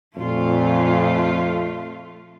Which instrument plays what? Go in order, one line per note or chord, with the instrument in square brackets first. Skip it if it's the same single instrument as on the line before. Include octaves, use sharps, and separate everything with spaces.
[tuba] F2 [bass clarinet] A#2 [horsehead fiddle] A3 F4